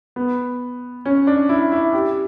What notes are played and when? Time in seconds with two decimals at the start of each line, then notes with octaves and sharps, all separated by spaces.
0.16 B3
1.05 C#4
1.27 D4
1.49 E4
1.72 E4
1.93 G4